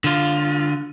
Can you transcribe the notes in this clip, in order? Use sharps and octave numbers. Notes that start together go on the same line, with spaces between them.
D3 F4